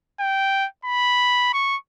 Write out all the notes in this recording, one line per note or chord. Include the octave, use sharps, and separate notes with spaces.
G5
B5
C#6